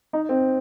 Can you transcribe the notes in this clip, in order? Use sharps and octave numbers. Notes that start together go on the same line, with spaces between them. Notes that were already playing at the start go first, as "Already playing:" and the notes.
D#4
C4